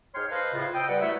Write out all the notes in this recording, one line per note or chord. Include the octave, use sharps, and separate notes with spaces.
G#2 C#5 G5 C6 F6
A4 B4 C5 D#5 F5
A2 C#3 F4
C4 A4 D#5 G5
G3 B4 F#5
F#3 A3 E4 E5